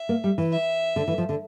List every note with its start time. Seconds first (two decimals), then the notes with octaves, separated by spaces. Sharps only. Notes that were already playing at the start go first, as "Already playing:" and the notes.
Already playing: E5
0.09 A#3
0.24 G3
0.38 E3
0.52 E5
0.96 D3
1.08 E3
1.18 F3
1.29 D3